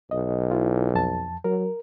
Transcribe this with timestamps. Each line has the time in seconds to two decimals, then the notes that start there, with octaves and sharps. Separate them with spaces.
0.11 B1 D#5
0.51 E4 F4
0.95 F2 A5
1.44 F#3 A#4